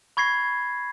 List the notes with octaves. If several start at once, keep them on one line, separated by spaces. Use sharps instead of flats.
B5 C#6 G#6 A#6 C7